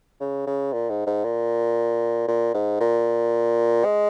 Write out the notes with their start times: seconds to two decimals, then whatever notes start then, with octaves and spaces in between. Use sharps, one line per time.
0.20 C#3
0.47 C#3
0.73 A#2
0.90 G#2
1.06 G#2
1.24 A#2
2.28 A#2
2.54 G#2
2.80 A#2
3.85 G#3